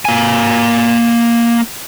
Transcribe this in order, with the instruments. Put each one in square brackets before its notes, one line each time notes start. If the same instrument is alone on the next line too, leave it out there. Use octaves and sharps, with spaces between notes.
[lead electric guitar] A#3 G#5